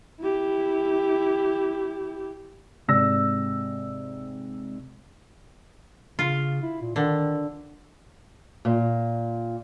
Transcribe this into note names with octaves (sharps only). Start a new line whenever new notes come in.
E4 G4
G#2 C3 D5 E6 A#6
C#3 F4
E4
A#2
D3 D#3
A#2